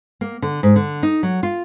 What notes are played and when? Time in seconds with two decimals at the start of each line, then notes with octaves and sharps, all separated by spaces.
0.21 A#3
0.42 D3
0.63 G#2
0.76 D3
1.03 D#4
1.23 F#3
1.43 F4